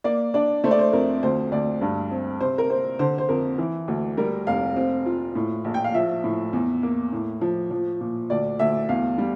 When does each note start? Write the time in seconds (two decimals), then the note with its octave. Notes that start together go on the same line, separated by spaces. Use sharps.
0.04 A#3 D5
0.34 D4 D5
0.64 A3 C5
0.71 D5
0.79 C5
0.93 F2 A#4
1.23 D2 C5
1.52 D2 D5
1.81 G2
2.11 C4
2.41 C3 C5
2.58 A#4
2.70 C4 C5
2.99 D3 C5
3.18 C5
3.29 F2 A#4
3.58 E3
3.88 D2
4.17 G3 A#4
4.47 F1 F5
4.76 C4
5.06 F4
5.35 A2
5.64 A#1
5.74 G5
5.84 F5
5.94 F3 E5
6.24 A2
6.53 E2
6.83 A#3
7.12 A2
7.41 F3
7.71 F3
8.01 A#2
8.30 D2 D5
8.59 D2 E5
8.89 E2 F5
9.18 G3